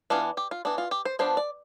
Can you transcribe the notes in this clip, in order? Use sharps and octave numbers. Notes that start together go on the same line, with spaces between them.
E3 B3 D4 F4
G4
F4
E3 B3 D4
F4
G4
C5
F3 B3 D4 C5
D5